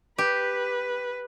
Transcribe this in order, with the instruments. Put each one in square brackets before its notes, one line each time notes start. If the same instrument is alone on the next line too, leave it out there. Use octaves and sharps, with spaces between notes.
[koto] G4 [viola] B4